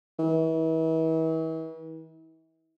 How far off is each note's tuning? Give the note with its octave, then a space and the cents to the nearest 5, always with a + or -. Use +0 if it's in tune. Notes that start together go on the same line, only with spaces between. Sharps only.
E3 -40